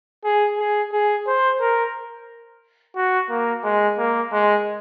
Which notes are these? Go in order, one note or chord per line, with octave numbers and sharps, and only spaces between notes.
G#4
G#4
G#4
C5
A#4
F#4
A#3
G#3
A#3
G#3